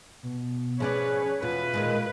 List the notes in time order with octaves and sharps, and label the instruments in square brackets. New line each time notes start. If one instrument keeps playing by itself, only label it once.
[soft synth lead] B2
[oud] F3 C#4 D5 [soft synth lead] G#4 [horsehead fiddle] B4 C#5
[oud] E2 B2 [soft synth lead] F4 [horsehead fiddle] B4
[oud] A#2 D#3 G#3